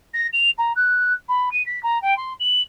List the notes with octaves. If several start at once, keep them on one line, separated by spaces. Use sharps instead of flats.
A#6
F7
A#5
F#6
B5
D#7
B6
A#5
G5
C6
F#7